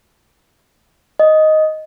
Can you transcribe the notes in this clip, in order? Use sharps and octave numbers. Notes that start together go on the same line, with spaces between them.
D#5